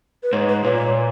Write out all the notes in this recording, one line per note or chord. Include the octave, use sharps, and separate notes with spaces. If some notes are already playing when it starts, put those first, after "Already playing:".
B4
G#2 C#5
B4
A#2 C#5